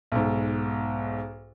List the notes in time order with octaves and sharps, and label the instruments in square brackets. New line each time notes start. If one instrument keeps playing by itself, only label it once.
[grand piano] B1 G#2